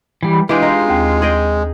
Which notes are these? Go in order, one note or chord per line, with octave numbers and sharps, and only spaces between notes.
E3 G3
E3 G#3 D4 F4 G4 G#4 B4
D#4
D#2 C4
G#4 D#5 G5